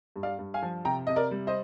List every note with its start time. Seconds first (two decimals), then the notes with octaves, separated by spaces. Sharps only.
0.16 G2
0.23 D5 F5
0.39 G2
0.54 F5 G#5
0.62 F3
0.85 C3 G5 A#5
1.07 C3 D#5
1.16 A#4 D5
1.31 G3
1.47 C5 D#5